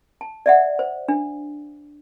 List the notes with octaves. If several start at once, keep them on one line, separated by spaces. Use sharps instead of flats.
A5
D5 E5 F#5
C5
D4